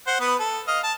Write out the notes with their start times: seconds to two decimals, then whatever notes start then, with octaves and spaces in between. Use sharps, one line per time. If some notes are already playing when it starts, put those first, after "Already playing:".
0.07 C5 F#5
0.20 B3 B4
0.39 A4
0.68 D#5 F5
0.83 A5